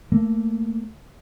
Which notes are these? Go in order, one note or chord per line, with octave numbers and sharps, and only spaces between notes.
A3 A#3